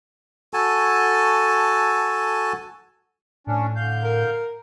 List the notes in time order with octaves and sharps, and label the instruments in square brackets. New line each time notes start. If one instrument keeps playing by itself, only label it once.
[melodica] F#4 A4 G#5 A5
[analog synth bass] A2 [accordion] C#4 D4
[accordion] D3 F5 G6
[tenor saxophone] A#4